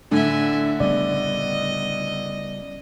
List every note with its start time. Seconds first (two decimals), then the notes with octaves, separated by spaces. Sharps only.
0.11 A2 D3 D4 E5 G#5
0.80 C#3 G3 B3 D5 D#5